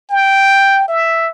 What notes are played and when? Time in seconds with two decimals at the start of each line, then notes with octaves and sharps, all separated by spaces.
0.10 G5
0.88 E5